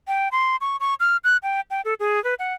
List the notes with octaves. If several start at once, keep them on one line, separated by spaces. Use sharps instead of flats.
G5
C6
C#6
C#6
F6
F#6
G5
G5
A4
G#4
B4
F#5